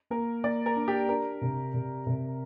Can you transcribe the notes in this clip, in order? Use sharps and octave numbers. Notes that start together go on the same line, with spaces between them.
A#3 A#4
A#3 D5
A#4
D4
G4
D4 A#4
C3
C3
C3